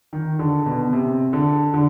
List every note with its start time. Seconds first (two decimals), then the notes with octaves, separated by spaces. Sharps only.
0.13 D#3
0.39 D3
0.66 B2
0.93 C3
1.33 D3
1.74 D3